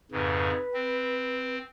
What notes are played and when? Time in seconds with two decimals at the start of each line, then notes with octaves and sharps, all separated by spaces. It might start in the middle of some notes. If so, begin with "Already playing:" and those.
0.12 F2 G#2 C#3 B4
0.74 C4